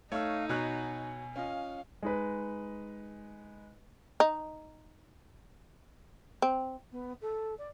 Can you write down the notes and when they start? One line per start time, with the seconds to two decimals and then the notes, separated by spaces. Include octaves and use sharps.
0.12 A3 D#4 C#5 F5 C#6 E6
0.49 B2 F#4 C#5 G#5 A#5 F#6
1.36 C#4 F4 D#5 F5
2.02 G#3 D#4 B4
4.20 D#4
6.42 C4
6.91 B3
7.21 A4
7.58 D5